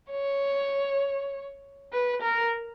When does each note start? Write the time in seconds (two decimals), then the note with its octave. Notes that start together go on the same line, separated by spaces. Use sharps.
0.11 C#5
1.93 B4
2.22 A#4